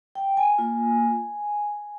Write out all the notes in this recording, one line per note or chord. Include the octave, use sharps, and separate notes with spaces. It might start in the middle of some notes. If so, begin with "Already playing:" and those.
G5
G#5
A#3 F4